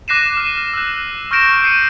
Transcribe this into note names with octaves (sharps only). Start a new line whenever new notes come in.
D6 F#6 A#6 C7 D#7 E7
F6 D#7
E6 F#6
C#6 F6 G6 A#6 D7 E7
E6 G6 C7 C#7 D#7